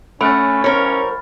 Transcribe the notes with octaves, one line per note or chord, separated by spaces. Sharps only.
A3 C#4 F#5 B5 F6 A6
C2 C#4 A#4 C5 C#5